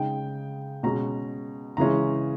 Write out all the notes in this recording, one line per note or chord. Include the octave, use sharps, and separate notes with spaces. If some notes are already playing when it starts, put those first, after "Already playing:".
Already playing: C#3 G#3 D#4 G5
B2 G#3 C#4 A#5
C#3 E3 G#3 C#4 A#5